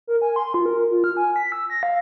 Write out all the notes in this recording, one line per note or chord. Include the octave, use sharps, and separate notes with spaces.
A#4
G#5
C6
F4
A#4
F4
F6
G#5
B6
E6
A#6
F5